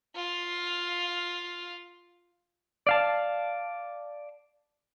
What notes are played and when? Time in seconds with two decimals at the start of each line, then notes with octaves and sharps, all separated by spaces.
0.15 F4 F5
2.87 D5 F5 A5